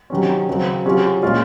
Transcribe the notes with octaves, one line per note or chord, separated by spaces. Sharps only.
C3 D#3 F#3 C#4
C#3 F#3 C4
C3 F#3 C#4 F4 G#4
A#2 G#3 C#4 F4 G#4